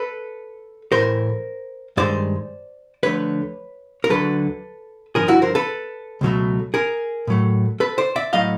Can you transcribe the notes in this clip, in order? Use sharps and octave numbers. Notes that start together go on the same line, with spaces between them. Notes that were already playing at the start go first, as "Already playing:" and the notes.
Already playing: A4 B4
A2 E3 A3 A#4 C5
G2 D#3 G#3 C5 D5
D2 D3 F3 A3 B4 C#5
A#4
D2 D3 F#3 A4 B4
G2 D3 F3 G#4 A#4
E4 F#4
A#4 C5
A4 B4
C#2 B2 F#3 A3
G#4 A#4
A2 F#3 A3
A4 B4
C5 D5
D5 E5
A2 F#3 A3 D#5 F5